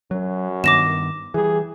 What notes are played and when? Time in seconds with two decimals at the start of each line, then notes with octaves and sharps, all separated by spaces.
0.11 F#2 F#3
0.64 G2 D#3 B3 D6 A#6 E7
1.34 E3 G3 G#4